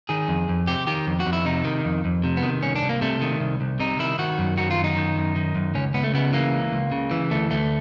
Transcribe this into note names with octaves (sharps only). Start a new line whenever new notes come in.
D#3 G#4
F2
F2
C3 G4
D#3 G4
F2
F#4
F2
E4
C3 D#4
D#3
F2
F2
C3
B3
D#3
C2 C#4
D4
C2
A#3
C3 A3
D#3
C2
C2
C3 D#4
D#3 E4
D#3 F#4
F#2
D#3 F#4
F4
F#2
D#4
D#3
F#2
D#3
F#2
C#2 C#4
C#2 B3
A3
C#3 B3
E3 A#3
C#2
C#2
C#3
E3
D2 A3
D2 A3